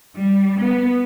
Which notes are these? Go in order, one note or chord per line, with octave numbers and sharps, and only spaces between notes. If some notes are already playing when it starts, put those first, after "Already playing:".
G3
B3